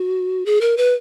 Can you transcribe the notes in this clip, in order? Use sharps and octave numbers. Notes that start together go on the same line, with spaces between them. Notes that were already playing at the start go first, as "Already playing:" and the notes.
Already playing: F#4
G#4
A#4
B4